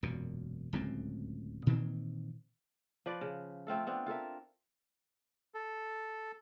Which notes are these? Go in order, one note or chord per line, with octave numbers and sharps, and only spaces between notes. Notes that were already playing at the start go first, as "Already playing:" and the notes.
E1 F#2 A#2
D1 C#2 A2 C4
A#2 D#3 E3 C4
F3 B4 D5
C#3
A3 C4 F4 A4
B3 C4 D4
F4 A4 A#4 E5
A4